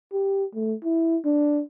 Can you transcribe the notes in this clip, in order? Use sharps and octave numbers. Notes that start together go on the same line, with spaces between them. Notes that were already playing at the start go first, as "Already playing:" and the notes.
G4
A3
E4
D4